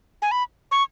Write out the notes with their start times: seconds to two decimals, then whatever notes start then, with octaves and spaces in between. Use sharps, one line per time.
0.22 G#5
0.31 B5
0.72 C#6